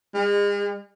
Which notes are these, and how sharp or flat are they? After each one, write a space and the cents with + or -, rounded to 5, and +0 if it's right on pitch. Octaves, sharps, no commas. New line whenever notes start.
G#3 -40